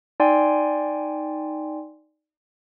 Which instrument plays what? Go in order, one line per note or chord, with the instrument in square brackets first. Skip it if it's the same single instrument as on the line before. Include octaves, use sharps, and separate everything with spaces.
[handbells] D#4 D5 G5 G#5 C6